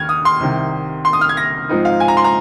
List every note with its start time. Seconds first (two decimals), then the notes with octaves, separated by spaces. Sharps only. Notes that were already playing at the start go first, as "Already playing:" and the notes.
Already playing: D#2 F6 G#6
0.09 D#6
0.25 C6
0.40 C2 C3 D#3
1.05 C6
1.13 D#6
1.21 F6
1.29 G#6
1.37 A#6
1.69 G#2 F3 C4 D#4
1.85 F5
2.00 G#5
2.08 A#5
2.17 C6
2.24 A#5